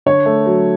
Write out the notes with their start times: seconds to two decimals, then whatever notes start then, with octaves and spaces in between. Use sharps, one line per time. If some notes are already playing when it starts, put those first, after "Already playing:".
0.06 D3 C#5
0.26 A3
0.46 F#3